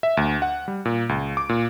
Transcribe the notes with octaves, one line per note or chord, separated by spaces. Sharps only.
E5
D2
F#5
G3
A#2
C#2
D6
A#2